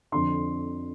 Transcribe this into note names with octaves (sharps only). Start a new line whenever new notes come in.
F2 D3 C6